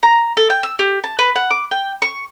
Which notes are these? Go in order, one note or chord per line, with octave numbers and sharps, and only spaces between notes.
A#5
A4
G5
E6
G4
A5
B4
F#5
D6
G5
C#6